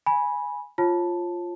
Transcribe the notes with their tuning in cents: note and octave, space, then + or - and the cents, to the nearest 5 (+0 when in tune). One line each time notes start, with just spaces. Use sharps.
G#5 +0 B5 -15
F4 +0 C#5 -35 A5 +0